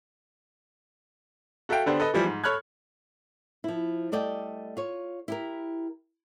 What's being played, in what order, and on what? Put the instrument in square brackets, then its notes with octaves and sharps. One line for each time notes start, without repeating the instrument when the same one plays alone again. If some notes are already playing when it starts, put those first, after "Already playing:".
[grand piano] F#4 A4 E5 F5 G5
D3 B3 D4 G4 C5
A4 B4 D#5
E3 F3 G3
G#2
A4 C#5 B5 F6 F#6 G#6
[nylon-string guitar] F3 E4
G3 A3 D5 D#5 G5
F4 C#5
E4 G4 A#4